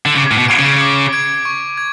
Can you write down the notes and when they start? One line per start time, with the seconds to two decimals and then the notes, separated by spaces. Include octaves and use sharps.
0.06 D3
0.16 C#3 D6
0.31 A2
0.37 B2
0.48 G#6 D7
0.59 C#3
0.81 D6
1.13 G#6 D7
1.45 C#6
1.78 G#6